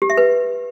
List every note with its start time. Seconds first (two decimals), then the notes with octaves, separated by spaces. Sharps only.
0.02 G4
0.10 E5
0.17 B4